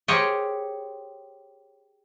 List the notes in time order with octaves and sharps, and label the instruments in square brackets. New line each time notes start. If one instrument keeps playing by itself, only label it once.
[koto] G4 G#4 A#4 C5 C#5